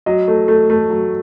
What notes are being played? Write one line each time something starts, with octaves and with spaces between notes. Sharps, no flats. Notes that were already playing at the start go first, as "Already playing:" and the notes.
F#3 D#5
A3
A3
A3
F#3